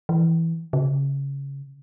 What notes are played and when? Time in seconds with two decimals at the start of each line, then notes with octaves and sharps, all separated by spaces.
0.09 E3
0.73 C#3